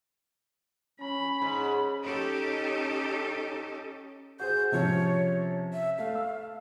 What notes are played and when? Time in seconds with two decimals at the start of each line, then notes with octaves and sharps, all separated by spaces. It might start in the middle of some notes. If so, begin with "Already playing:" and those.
1.01 C#4 B5
1.42 G#2
2.03 C#4 D#4 G4 A4
4.40 F#4 G#4 C5 G6
4.72 C3 F3 C#4 C#5
5.73 E5
5.98 A3 F5
6.15 E6